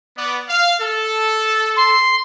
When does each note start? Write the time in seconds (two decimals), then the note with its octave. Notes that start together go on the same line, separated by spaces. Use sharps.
0.17 B3 D5
0.48 F5
0.79 A4
1.76 C6